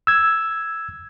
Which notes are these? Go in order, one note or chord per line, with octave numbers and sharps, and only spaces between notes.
E6 G#6